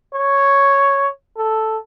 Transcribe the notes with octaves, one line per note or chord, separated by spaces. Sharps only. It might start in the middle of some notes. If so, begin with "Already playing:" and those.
C#5
A4